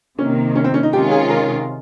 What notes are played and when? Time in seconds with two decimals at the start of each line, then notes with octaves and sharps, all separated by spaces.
0.19 C3 D#3 A#3 C#4
0.55 C#4
0.64 C4
0.74 C#4
0.83 D#4
0.93 C3 D#3 G#3 C#4 F4 G4
1.11 G#4
1.30 A#4